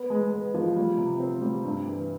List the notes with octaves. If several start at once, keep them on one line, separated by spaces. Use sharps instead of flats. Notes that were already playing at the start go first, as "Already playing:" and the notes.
Already playing: B3
G#3
B3
F3
G3
C3
C4
G3
G2
E3